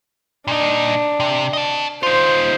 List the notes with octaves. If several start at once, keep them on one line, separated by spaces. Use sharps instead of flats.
A#2 D4 D#4
C3
D#5 A5
D#4 F4 C5